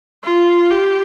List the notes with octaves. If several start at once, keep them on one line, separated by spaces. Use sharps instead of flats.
F4
G4